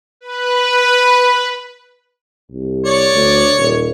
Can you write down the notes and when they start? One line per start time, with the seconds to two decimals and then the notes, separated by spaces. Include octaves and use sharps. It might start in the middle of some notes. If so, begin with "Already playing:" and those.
0.21 B4
2.52 C2
2.85 C#5 D5
3.14 D2
3.58 D#1